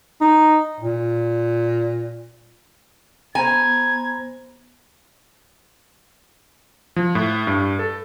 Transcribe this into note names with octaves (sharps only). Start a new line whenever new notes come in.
D#4
A#2
B3 C5 G#5 A#5 G#6
F3
A2
G2
A4